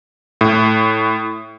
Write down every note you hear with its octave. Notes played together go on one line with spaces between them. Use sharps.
A2